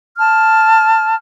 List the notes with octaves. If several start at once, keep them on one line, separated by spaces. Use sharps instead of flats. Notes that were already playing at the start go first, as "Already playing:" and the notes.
A5 F6